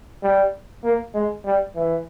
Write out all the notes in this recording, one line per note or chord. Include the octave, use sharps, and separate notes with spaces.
G3
A#3
G#3
G3
E3